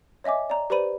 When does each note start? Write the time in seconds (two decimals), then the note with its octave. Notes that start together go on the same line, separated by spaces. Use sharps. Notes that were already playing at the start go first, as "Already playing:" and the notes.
0.24 C#5 D#5 E5 G#5 D6
0.50 D5 A#5
0.70 G4 B4 C5 D5 B5 D#7